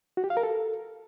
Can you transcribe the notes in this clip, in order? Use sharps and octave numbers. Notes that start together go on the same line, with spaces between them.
F#4
G4
F5
A#4
A4